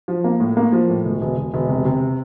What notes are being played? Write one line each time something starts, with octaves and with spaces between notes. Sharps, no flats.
F3
A#3
A2
A#3
F3
A2
E1
E1
E1
E1
C3
C3